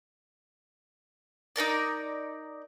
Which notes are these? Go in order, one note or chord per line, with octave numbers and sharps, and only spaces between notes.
D#4 F#4 A#4 D5